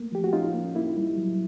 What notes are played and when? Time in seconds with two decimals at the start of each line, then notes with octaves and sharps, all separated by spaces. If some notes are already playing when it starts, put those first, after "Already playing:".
Already playing: A3 A#3
0.12 F3 G4
0.24 F#4
0.33 C#4 D#4 F4
0.54 A#3
0.75 A#3 E4
0.97 G3
1.18 F#3